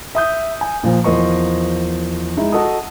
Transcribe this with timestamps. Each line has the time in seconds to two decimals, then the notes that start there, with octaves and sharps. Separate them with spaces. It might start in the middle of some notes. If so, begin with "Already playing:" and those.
0.15 E5 D#6 G6
0.61 G#5
0.84 A#2 F3
1.04 E2 F3 A#4 C5 D#5 C#6
2.37 G#3 D#4 E4
2.52 F#4 A4 D#5 D#6